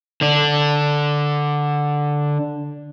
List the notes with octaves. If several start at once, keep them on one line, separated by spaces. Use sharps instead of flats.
D3 D4